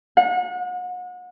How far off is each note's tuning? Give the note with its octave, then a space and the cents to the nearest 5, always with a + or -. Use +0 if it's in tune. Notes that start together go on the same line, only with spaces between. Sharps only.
F#5 -35